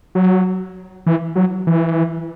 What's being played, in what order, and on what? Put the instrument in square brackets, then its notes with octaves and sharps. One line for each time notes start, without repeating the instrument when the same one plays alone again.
[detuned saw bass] F#3
E3
F#3
E3